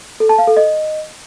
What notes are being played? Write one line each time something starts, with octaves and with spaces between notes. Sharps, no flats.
A4
A5
F5
A4
D#5